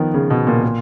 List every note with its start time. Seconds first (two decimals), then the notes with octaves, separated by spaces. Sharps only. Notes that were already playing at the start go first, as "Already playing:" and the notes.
Already playing: D#3 F3 B3
0.14 C#3
0.30 B2
0.47 A#2
0.63 A#2